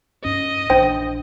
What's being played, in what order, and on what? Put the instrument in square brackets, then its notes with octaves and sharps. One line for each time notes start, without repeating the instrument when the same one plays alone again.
[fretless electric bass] G2 C#4 [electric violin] D#5
[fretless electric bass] A#1 E3 D4 [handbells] C5 G5